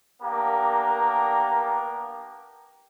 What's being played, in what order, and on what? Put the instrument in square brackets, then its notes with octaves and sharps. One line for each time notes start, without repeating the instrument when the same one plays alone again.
[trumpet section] A#3 B3 D4 G4 A#4